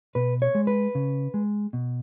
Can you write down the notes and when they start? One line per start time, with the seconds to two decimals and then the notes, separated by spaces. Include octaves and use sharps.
0.15 B2 B4
0.42 C#5
0.55 G#3
0.67 B4
0.95 C#3
1.34 G#3
1.73 B2